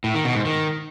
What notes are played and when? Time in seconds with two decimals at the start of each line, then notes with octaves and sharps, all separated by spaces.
0.04 A2
0.14 D#3
0.25 B2
0.35 G#2
0.45 D#3